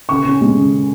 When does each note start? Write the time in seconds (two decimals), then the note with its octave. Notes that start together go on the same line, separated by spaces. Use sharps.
0.09 C#3 C#6
0.25 C#4
0.41 G#3
0.57 C#3